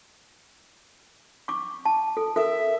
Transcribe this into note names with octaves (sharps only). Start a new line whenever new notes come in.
C#6 D6
A5
A4
A4 A#4 E5